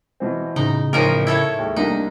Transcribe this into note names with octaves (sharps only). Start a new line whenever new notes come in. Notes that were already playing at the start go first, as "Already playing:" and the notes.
B2 E3 C4
A2 C#3 D#4
A1 F3 D#4 A#4
E4 A4 C#5
D#2 G#3 A3
C2 A3 A#3 D4 D#4